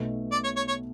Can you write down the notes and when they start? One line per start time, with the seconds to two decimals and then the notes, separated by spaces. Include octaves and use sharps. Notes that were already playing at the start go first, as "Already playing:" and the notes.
Already playing: B1 B2 A3
0.32 D5
0.44 C#5
0.56 C#5
0.68 C#5